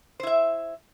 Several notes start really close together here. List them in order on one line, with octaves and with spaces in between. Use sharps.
C5 E4 E5